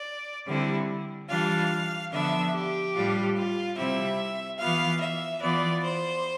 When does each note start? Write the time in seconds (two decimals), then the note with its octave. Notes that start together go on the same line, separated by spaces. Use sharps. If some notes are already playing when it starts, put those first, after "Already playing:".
Already playing: D5
0.47 D3 G3 C4 E4
1.29 E3 G3 D4 F4 F5
2.12 D3 F3 B3 D4 E5
2.54 G4
2.94 A2 G3 D4 F4
3.35 F4
3.76 C3 G3 C4 E4 E5
4.59 E3 B3 F4 F5
5.01 E5
5.41 E3 B3 F4 D5
5.83 C5